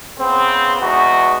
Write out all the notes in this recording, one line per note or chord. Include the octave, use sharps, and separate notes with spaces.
C#3 B3 C4
E2 G#3 B3 D#4 F#4